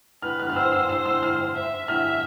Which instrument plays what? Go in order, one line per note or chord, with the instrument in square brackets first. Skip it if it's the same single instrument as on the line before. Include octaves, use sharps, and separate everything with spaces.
[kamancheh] B4 [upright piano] F6
[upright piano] F6
F6
[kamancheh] C5 [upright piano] E6
[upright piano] E6
E6
E6
F6
[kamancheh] E5
[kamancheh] E5 [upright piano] F6